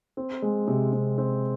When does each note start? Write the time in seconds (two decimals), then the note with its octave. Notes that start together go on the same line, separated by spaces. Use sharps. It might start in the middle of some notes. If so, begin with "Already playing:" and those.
0.17 C4
0.42 G#3
0.68 C3
0.93 C3
1.18 C4